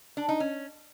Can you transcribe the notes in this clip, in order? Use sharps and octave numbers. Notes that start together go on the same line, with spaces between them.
D4
D#4
C#4